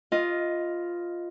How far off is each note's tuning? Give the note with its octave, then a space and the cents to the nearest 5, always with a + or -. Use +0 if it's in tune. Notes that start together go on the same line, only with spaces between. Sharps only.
F4 +0 B4 +0 D#5 +10